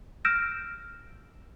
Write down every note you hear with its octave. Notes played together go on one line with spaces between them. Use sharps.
E6 F6 G6 A#6 D7 E7